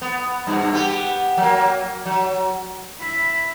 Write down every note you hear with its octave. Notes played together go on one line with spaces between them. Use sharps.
B3
G2 B2
B3 G4
F#3 A#3
F#3
E4 E5